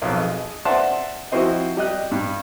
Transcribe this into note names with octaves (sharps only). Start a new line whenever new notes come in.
B1 F2
G#4 D#5
C5 D5 E5 F#5 A5 C6
F3 C4 E4 F#4 C5 D#5
G3 D#5 F#6
G2